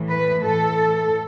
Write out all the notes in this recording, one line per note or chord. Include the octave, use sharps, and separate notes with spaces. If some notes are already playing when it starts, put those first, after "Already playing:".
Already playing: A2 E3
B4
A2 E3 A4